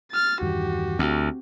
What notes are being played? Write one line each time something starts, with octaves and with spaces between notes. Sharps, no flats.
F6 A6
E2 G2 D#3 F#4 G4
D2 C4